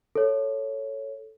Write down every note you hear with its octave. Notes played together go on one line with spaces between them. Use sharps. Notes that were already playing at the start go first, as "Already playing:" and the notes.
A4 C#5